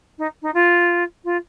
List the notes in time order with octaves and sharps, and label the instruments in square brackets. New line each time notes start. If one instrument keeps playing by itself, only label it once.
[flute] D#4
D#4
F4
F4